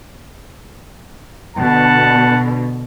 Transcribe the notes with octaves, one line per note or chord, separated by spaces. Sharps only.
B2 D3 F#5 A5